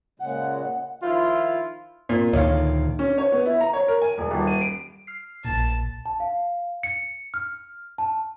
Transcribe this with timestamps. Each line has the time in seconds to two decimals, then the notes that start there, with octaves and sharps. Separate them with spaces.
0.20 A#2 C#3 G#3 F#5
1.02 D#3 F3 E4 F4
2.09 A#2
2.33 D2 A#2 D#3 C#5 F5
2.99 C#4
3.18 C#5
3.32 B3
3.46 E4
3.61 A#5
3.73 C#5
3.88 A#4
4.02 G#5
4.18 E1
4.31 D#1
4.47 D#7
4.61 D7
5.07 F6 C7
5.45 A#1 A#2 A5
6.06 A5
6.20 F5
6.83 C#7
7.34 F6
7.98 A5